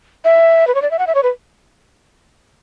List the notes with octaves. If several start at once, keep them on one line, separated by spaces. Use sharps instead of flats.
E5
B4
C#5
D5
E5
F#5
E5
C#5
B4